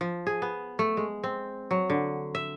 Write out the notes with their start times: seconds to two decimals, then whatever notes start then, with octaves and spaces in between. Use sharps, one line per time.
0.01 F3
0.27 G#4
0.42 B3
0.79 A3
0.97 G#3
1.24 C4
1.71 F#3
1.90 D3
2.35 E5